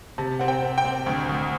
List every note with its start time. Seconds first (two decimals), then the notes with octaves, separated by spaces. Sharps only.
0.18 C3 A5
0.39 C4 F#5
0.48 G5
0.62 C4
0.78 G5
0.85 C4
1.06 D2
1.29 D2